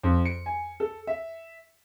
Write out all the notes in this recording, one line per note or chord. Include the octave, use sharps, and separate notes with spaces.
F2
C#7
G#5
A4
E5